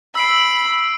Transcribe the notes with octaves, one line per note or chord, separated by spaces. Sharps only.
B5 E6 C7 D7